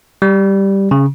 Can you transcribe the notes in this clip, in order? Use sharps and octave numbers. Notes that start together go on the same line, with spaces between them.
G3
C#3